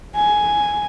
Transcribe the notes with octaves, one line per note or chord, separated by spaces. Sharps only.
G#5